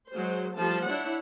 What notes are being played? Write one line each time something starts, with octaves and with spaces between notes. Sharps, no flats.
F#3 G#3 C5
F3 G3 A3 A5
D4 E4 C#5 F#5